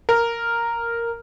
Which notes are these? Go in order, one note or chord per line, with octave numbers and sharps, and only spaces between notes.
A#4